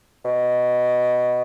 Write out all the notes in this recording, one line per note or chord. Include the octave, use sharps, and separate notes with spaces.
B2